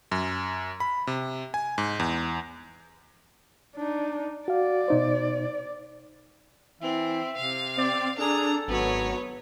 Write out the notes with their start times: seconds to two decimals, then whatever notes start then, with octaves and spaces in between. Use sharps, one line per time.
0.12 F#2
0.80 B5
1.07 C3
1.54 G#5
1.78 G#2
2.00 E2
3.76 D4 D#4
4.48 F#4 D5 F5
4.88 B2 D#4 C5
6.81 E3 C4 E5
7.37 C3 F5
7.77 C4 D5
8.18 D4 G#4 A4 A#5
8.68 G#1 F#3 B3 C#5